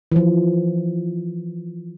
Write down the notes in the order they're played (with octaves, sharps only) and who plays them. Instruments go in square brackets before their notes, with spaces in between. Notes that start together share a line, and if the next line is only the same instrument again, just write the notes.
[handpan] E3 F3